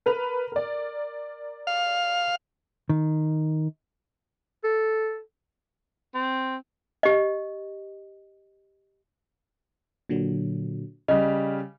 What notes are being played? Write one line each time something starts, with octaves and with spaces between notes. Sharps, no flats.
A#4 B4 F7
A#4 D5
F5
D#3
A4
C4
G4 D#5
A#2 D3 F#3
C#3 G3 D#5 F6